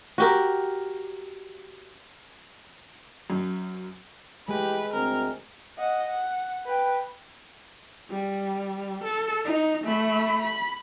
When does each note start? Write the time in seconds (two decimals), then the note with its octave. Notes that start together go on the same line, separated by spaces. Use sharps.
0.18 F#4 G4 A#4
3.30 F#2
4.48 E3 G#3 A3 G4 B4
4.93 D2 C4 A#4
5.78 D#5 F#5
6.08 F#5
6.66 B4 G5
8.10 G3
9.04 A4
9.45 D#4
9.85 A3 B5
10.42 B5